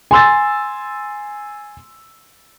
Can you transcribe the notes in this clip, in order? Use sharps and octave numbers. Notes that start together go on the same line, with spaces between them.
G#5 C6 E6 A6